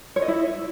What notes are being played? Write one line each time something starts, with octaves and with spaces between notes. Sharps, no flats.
C#5
D#5
E4